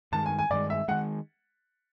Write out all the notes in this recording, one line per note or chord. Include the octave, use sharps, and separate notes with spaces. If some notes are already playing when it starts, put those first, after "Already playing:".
G2 D#3 G#3 A5
G#5
G#5
G2 D#3 G#3 D5
E5
D#3 G#3 F#5